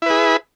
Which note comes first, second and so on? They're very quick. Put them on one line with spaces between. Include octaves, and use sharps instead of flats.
E4 B4 G#4